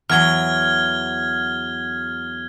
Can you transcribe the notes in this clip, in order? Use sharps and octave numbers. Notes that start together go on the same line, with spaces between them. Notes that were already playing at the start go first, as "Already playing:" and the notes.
E2 F#3 F6 G#6 G7